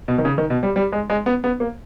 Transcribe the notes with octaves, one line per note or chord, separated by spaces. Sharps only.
B2
D#3
C#3
D#3
B2
G3
G3
G#3
G#3
B3
B3
A#3